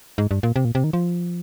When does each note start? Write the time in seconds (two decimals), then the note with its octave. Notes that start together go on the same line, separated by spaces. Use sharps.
0.18 G#2
0.31 G2
0.43 A#2
0.56 C3
0.65 A#2
0.75 C3
0.84 D#3
0.93 F3